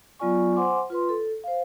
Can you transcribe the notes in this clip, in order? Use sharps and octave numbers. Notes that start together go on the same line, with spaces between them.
F#3 B3 F4 D5 G#5 C#6
C5 F#5 G#5 C6 D6
F4 B4 C6
A4
C5 F5